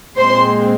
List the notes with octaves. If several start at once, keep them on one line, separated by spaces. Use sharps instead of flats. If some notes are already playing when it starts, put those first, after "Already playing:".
A#2 G#3 C4 C5 C6